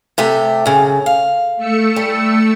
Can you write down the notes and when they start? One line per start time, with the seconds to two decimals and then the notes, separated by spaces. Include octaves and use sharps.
0.18 C3 A3 G4
0.66 F#2 C#3
1.06 F5
1.57 A3 E6 C#7
1.96 G3